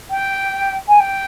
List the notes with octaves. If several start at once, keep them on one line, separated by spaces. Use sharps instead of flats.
G5
G#5
G5